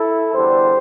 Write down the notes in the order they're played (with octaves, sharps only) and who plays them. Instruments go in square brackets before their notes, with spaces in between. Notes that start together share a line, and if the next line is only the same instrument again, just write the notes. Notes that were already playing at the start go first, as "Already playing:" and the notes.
Already playing: [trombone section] E4 A4
E2 D3 G3 G4 C5